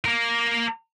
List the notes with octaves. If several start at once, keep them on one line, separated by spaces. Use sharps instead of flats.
A#3 A#4